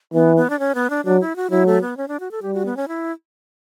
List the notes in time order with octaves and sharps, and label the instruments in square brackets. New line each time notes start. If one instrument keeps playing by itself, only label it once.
[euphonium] E3 [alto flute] B3
[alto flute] B3
D4
C#4
B3
D4
[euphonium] F#3 [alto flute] D4
[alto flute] E4
F#4
[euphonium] F#3 [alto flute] E4
[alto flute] A3
B3
C#4
D4
F#4
A4
[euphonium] G3 [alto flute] G4
[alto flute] F#4
B3
C#4
E4